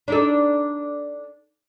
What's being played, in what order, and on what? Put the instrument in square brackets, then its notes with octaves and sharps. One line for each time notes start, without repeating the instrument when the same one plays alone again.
[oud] D4 D#4 A4